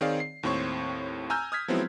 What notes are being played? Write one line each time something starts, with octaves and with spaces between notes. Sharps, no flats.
D#3 C4 G#4 C#5 D5 F5
C7
D#2 A2 C4 C#5 C#6
G#5 A#5 E6 F6 G6
D#6 F6 G#6 B6
F3 F#3 G#3 B3 C4 E4